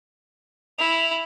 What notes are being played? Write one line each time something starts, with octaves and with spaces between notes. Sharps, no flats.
E4 F7